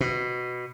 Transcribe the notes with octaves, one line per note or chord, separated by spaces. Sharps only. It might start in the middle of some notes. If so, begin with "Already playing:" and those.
B2